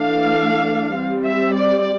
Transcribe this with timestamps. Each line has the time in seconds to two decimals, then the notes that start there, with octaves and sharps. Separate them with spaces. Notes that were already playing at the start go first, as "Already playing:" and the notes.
Already playing: E3 A3 D4 F5
0.96 G3 C4
1.25 E5
1.54 D5